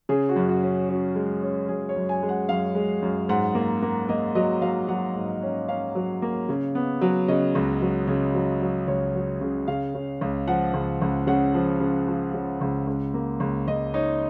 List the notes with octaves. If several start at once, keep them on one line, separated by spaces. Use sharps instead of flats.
C#3 G#4
F#4
F#2
F#4
C#4
C#4 F#4
G#3
C#4
F#2 G#4
C#5
F#2
G#5
G#3
F#5
F#2 F5
G#3
F#2
G#2 F#5
A#3
A#3
A#3 D#5
F#3 D#5
F#3 F5
F#3 F#5
G#2
C#4
C#4 F5
F#3
A#3
C#3
B3
F#3
C#3 D#5
C#2
F#3
C#3
F#3
F#3
C#2 C#5
F#3
C#3
C#3 F5
C#3
C#2
F3 F#5
C#2
C#2
C#3 F#5
F3
C#3
F3
C#3
C#2
C#2
A#3
C#2
C#2 D#5
D#4 C#5